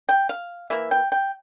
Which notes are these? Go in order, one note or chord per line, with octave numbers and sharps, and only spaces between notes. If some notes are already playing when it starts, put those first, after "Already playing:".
G5
F5
E3 A#3 E5
G5
G5